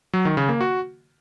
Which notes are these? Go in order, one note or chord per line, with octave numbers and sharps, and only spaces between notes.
F#3
D#3
C#3
A#3
F#4